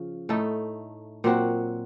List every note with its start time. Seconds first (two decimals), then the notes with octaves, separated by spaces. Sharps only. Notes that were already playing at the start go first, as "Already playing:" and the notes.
Already playing: C#3 F3
0.29 A2 A3 D#4 A4
1.24 A#2 F#3 C4 F#4